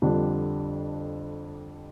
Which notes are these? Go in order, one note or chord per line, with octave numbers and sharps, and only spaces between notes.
F2 D3 G3 D4